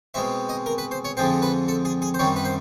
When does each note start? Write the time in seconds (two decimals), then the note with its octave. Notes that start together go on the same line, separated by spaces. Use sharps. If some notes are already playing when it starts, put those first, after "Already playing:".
0.14 B2 G#3 C4 E5
0.49 D#5
0.66 A#4
0.78 B4
0.91 C5
1.05 C#5
1.17 F2 D3 F3 G#3 C4 C5
1.42 B4
1.68 A4
1.85 G#4
2.02 G#4
2.14 C5
2.19 F#2 D#3 G3 C4 C#5
2.36 B4
2.45 C5